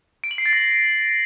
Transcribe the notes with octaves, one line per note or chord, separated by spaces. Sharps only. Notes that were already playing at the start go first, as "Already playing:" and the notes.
D7
F#7
C7
A6
A#6